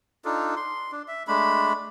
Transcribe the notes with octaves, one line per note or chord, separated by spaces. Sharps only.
D4 D#4 F4 A4
C6
D4
E5
G#3 A3 D4 B5